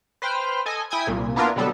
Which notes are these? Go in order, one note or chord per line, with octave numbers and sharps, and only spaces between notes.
B4 C5 G5 F6
A4 D#5 G#5
E4 G5 G#5 D#6 G#6
C2 A#2
A#3 B3 D4 E4 F4 A#4
B2 D3 F#3 G3 B3 A4